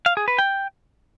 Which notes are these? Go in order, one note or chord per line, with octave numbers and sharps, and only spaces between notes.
F5
G#4
B4
G5